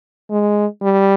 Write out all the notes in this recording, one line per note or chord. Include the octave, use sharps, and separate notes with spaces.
G#3
G3